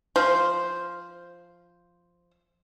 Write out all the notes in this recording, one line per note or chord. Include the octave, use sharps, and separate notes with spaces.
F3 C5